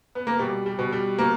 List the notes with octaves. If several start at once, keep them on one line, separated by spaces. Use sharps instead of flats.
B3
A#3
B2 G3
G3
B2
G3
B2 A#3